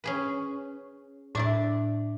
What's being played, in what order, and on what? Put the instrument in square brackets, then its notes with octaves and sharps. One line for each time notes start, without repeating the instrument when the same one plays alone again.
[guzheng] C#4 G#4 B4
[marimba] A2 [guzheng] D4 E4 D5